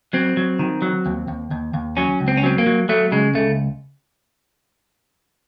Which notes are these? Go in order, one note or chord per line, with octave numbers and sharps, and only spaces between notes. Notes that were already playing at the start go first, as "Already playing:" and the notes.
F#3 C4
F#3
D#3
F#3
D#2
D#2
D#2
D#2
F#3 C#4
C#2
C4
C#4
F#3 C4
A#3
F#3
F#3 A3
C#3 G#3
C#2 A3